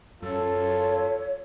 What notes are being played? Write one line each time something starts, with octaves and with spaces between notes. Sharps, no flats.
F#2 F4 A4 C#5